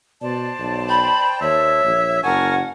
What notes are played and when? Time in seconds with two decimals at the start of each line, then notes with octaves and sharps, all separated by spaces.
0.22 B2 C5 D5 A5
0.59 B1
0.89 G5 B5
1.41 D#2 C#5 E5
1.84 A#1
2.23 F#1 A#4 F#5 G#5 A5 C#6